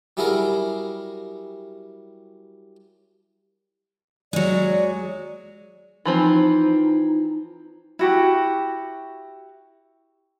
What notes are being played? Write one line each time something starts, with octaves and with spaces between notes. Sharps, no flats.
F#3 G3 E4 G#4 A#4
F#3 G#3 D5
E3 F3 C4 D#4
E4 F#4 G4